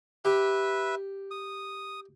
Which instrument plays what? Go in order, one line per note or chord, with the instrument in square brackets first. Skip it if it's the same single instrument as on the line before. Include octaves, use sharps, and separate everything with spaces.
[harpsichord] G4 [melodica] B4 E5
[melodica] D#6